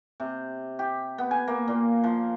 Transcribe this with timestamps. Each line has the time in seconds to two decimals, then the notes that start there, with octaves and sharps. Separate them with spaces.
0.20 C3
0.79 G4
1.18 B3
1.31 G#5
1.48 A#3
1.68 A#2
2.04 F3